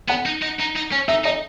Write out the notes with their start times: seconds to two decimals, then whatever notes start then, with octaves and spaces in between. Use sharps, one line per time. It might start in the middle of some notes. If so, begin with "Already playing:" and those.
0.09 B3 F#5
0.26 D#4
0.42 D#4
0.59 D#4
0.76 D#4
0.92 C#4
1.08 D#4 E5
1.25 D#4 D#5